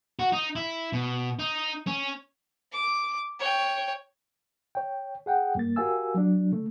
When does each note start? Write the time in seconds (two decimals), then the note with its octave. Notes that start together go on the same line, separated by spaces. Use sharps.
0.19 F#4
0.32 D#4
0.56 E4
0.93 B2
1.39 D#4
1.87 C#4
2.72 D6
3.40 C#5 G5
4.75 C#5 G5
5.26 G#4 F#5 G5
5.55 G2 A#3 A6
5.76 F#4 G4 A#4 F5 G#5 E6
6.14 F#3 D4
6.52 C#3 A3